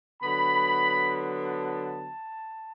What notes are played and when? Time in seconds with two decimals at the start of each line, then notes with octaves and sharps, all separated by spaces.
0.22 D3 F#3 B3 B5
1.40 A5